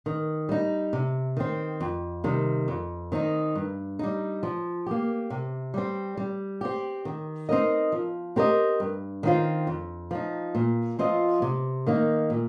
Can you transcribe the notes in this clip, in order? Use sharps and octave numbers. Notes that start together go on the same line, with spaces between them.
D#3
G3 D#4
C3
D#3 C4
F2
C3 D#3 G3
F2
D#3 C4 D#4
G2
G3 D#4
F3
A#3 G4
C3
G3 C4
G3
C4 G4
D#3
C4 D#4 A#4 D#5
F3
C4 G4 A#4 D#5
G2
D#3 C4 F4 C5
F2
F3 D#4
A#2
F3 C4 F4 D#5
C3
D#3 A#3 D#4
A#2